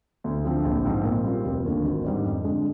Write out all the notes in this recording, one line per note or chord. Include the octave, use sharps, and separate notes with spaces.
D2
D3 F3 C4
A#1
G#2 F3 C4 F4
A#2
G3 C4 F4
F1
D#2 D3
G#1
G#2 G3 D4
F2
D3 G#3